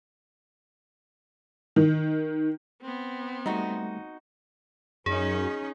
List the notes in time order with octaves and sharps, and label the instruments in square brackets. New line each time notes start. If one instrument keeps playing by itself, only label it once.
[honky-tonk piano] D#3
[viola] B3 C4
[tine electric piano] G3 A3 [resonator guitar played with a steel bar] D#4 F#4
[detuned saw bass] F#2 [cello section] C#4 D#4 [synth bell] G#4